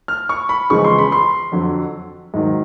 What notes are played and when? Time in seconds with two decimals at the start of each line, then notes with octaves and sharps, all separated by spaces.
0.08 F6
0.29 C#6
0.49 B5
0.70 E2 C#3 F3 G#3 C#6
0.84 C6
0.98 B5
1.12 C6
1.52 F2 D3 F#3
2.34 G#2 D#3 F#3